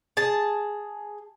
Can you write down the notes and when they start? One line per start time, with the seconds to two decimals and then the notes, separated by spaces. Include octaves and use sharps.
0.17 G#4 A5